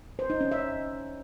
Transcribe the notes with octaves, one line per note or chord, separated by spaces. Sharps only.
C5
D#4
C#4
E5